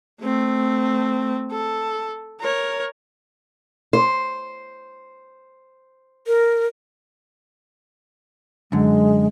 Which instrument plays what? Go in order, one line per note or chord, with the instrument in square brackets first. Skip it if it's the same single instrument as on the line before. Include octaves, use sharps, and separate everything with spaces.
[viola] A3 C4
A4
A#4 C#5
[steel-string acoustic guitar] C5
[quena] A#4
[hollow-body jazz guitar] F#2 D3 [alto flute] G#3